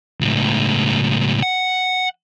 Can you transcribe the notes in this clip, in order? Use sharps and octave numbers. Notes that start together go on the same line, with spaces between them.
C#2 A2
F#5